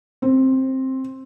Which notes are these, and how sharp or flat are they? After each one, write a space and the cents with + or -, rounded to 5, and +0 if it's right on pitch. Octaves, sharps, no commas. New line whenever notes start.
C4 +10